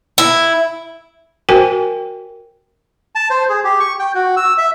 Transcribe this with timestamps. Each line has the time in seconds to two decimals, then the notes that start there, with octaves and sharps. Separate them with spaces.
0.18 E4
1.49 F#4 A#4 C5 G5 G#5
3.15 A5
3.30 C5
3.49 G#4
3.64 G4
3.80 C#6
3.99 G5
4.14 F#4
4.37 E6
4.58 E5